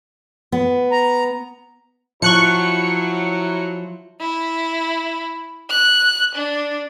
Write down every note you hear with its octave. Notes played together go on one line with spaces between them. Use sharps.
B3
A#5
F3 F#3 E4 C#6 F#6 C#7
E4
F#6
D4